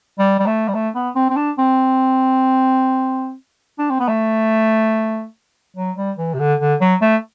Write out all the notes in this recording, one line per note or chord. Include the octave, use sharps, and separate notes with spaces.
G3
G3
A3
G3
A3
B3
C4
C4
D4
C4
D4
C4
B3
A3
F#3
G3
E3
C3
D3
D3
F#3
A3